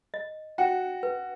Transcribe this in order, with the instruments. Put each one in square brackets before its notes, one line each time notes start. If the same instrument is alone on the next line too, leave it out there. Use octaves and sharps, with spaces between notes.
[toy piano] D#5
[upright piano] F#4 [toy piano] G5
[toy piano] B4